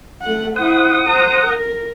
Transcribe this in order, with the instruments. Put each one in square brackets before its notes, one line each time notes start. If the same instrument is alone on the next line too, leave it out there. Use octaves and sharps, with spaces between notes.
[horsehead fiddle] A3 F#5
[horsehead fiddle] E4 C5 [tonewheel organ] F#5 D#6
[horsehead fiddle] C5 A#5
A#4